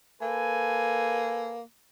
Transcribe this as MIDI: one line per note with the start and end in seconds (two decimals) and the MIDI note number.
0.22 1.62 58
0.22 1.61 69
0.22 1.61 71
0.22 1.61 80